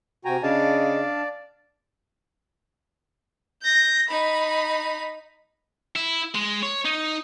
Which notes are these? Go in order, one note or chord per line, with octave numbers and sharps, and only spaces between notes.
C3 F#4 G5 G#5 A#5
C#3 D4 D5 D#5 F5 A5
G6 A#6
D#4 B5
E4
G#3
C#5
D#4